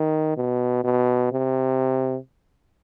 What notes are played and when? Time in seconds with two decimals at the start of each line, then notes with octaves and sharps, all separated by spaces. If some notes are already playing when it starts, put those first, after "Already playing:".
Already playing: D#3
0.37 B2
0.84 B2
1.32 C3